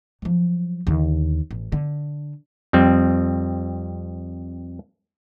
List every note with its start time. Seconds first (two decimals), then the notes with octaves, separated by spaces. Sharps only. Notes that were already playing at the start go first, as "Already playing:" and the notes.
0.22 F3 F#3
0.87 D#2 D3
1.51 A1
1.72 D3
2.73 F2 G3 C4